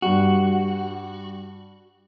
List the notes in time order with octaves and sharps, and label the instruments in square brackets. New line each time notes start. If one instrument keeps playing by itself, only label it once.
[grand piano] G2 G3 [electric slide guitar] F#4